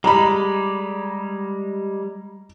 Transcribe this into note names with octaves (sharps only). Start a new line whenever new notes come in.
G3 G#3 A#5 B5